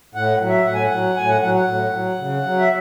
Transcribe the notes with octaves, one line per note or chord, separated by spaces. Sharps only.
A2 F#5
F#3
E5
A2 F#5
G#5
F#5
F#3
A2 G#5
F#5
F#3 F#5
F#5
A2
F#3
C#3
F#3
E5